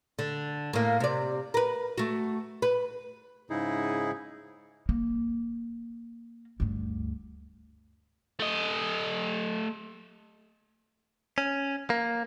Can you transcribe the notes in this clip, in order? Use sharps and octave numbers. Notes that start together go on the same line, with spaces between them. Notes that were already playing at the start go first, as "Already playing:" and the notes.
D3
A2 A#3
C3 D5
A#4 B4
A3 F#4
B4
G#2 C#3 D#4 E4 G#4
A#3
D2 G2
A3 D#5
C#4
A#3